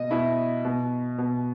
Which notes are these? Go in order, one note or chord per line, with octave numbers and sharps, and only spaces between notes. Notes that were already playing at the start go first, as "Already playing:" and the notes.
Already playing: B2 D#5
B2 E4
B2
B2